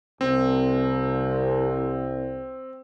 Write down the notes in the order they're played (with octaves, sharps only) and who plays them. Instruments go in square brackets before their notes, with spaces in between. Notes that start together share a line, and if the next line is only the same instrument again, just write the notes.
[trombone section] C2 [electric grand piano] C4